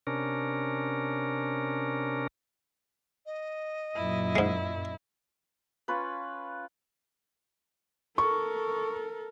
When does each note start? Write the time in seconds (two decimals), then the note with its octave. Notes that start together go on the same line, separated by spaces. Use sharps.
0.07 C3 C#4 D4 A#4
3.26 D#5
3.96 F#2 A#2 E4
4.36 G#2 G#3
5.88 C#4 F4 B4
8.18 A4 A#4 C#6